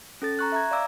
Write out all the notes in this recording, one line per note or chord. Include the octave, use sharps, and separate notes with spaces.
C#4 A4 A6
A#5 C#6 F#6
E5 A#5 G#6
D5 F5 A#5 D6 E6